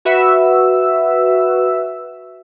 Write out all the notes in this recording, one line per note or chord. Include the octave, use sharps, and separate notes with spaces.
F#4 B4 E5 E6